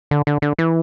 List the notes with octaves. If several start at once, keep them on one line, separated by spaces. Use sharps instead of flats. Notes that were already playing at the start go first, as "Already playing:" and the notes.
D3
D3
D3
E3